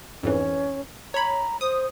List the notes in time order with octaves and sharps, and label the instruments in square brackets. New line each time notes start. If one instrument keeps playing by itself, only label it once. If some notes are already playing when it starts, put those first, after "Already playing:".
[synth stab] F2 G#2 E3 [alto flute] C#4
[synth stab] C#5 B5 [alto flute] A#5
[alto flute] C5 [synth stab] D#6